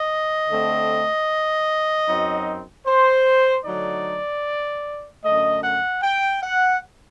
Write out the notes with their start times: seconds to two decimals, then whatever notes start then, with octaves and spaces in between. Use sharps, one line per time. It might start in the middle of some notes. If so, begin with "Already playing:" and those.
Already playing: D#5
0.50 D3 A3 C4
2.08 F#2 F#3 C4 D#4
2.87 C5
3.65 D3 F#3 A3 D#4 D5
5.23 F#2 D3 A3 D#5
5.64 F#5
6.02 G5
6.42 F#5